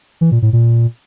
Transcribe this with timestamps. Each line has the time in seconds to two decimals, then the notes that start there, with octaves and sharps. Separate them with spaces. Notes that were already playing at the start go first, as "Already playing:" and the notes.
0.21 E3
0.32 A#2
0.42 A2
0.53 A#2